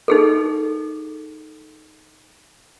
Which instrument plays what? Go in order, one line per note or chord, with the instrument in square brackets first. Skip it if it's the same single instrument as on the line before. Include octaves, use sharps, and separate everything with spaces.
[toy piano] D#4 G#4 A4